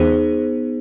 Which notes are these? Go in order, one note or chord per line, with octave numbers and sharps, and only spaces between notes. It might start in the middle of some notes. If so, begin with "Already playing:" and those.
Already playing: E2 E3 B3 D#4 G#4 C5